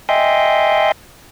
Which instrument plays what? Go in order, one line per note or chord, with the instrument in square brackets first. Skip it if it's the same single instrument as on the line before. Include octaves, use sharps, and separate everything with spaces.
[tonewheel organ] D#5 E5 G5 G#5 C6